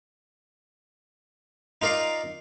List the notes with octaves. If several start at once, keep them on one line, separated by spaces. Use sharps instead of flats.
D#4 F4 A#4 D5 F5